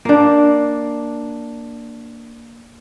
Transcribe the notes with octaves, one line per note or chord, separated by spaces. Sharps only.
A#3 D4